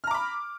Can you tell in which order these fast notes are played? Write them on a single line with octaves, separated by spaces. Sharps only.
F6 A#5 D6 B5